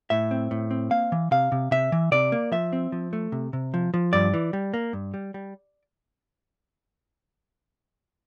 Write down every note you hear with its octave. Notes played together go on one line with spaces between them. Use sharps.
A2 E5
C4
A2
C4
A#3 F5
E3
C3 F5
C3
C3 E5
E3
C3 D5
A#3
F3 E5
C4
F3
A3
C3
C3
F3
F3
G2 D5
E3
G3
A#3
G2
G3
G3